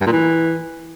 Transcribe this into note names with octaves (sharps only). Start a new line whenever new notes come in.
G2
A#2
E3